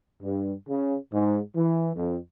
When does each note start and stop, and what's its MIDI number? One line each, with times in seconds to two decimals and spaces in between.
0.22 0.53 43
0.68 0.96 49
1.12 1.39 44
1.55 1.91 52
1.96 2.17 41